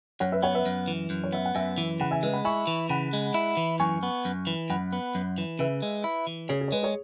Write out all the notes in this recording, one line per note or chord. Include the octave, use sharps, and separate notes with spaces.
F#2 C#5 F#5
B4 E5
B3 C#5 F#5
B4 E5
F#2
E3
F#2
C#5
B3 E5
F#5
F#2 E5 G#5
E3
C#3 F#5 B5
E5 G#5
G#3 B4 E5
F#5 B5
E4 G#5 C#6
E3
C#3 F#5 B5
G#3
E4
E3
F#2 G#5 C#6
B3
F#2
E3
F#2 F#5 B5
B3
F#2
E3
C#3 B4 E5
G#3
E4
E3
C#3 G#4 C#5
G#4
C#5
G#3 B4
G#4 C#5